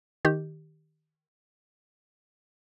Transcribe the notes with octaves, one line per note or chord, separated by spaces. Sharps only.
D#3 G4